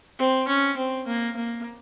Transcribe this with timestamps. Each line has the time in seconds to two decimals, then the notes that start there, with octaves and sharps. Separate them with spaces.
0.19 C4
0.48 C#4
0.77 C4
1.07 A#3
1.36 A#3